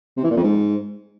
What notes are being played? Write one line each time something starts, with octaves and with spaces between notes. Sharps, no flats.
C3
E3
A#2
F2
G#2